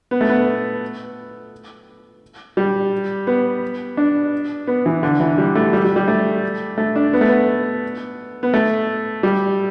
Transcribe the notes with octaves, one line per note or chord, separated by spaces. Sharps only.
B3
A3
B3
G3
B3
D4
B3
E3
D3
E3
G3
A3
G3
G3
G3
A3
A3
D4
B3
A3
B3
B3
A3
G3